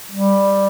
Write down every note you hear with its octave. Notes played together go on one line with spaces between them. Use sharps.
G3